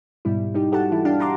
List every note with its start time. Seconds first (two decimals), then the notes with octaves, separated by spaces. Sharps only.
0.25 G#2 B2 G3 E4
0.54 G3 D#4 G4
0.72 F#4 G4 A4 F#5 A5
0.91 E3 E4
1.05 D4 G4 F5 A5
1.20 F#5 A#5 C6 D6